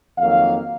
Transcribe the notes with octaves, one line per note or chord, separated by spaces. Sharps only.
F2 D#3 F#3 A#3 F5